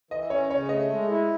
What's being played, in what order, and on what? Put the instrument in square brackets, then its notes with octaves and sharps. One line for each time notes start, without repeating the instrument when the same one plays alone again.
[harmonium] E3 [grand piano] D#5
[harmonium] C#4 [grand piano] C#5
[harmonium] C#3 [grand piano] C#5
[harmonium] A3 [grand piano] D#5
[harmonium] G#3
E4